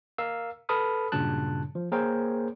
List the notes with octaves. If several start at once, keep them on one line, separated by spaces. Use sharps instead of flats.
A#4 F5 E6
A4 B4 A5 B5 D#6 F6
G2 A#2 C#3 F#3 A5 F#6
F3
A#3 G#4 A#4 C5 C#5 G5